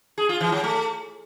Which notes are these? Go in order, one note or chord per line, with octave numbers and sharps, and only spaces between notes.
G#4
F4
E3
F#3
A3